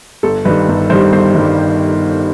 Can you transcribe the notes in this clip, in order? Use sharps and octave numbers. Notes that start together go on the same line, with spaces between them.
G1 A4
G2 D#3 G3 B4
G1
G2 D#3 G3 C5
G1 C5
G2 D#3 G3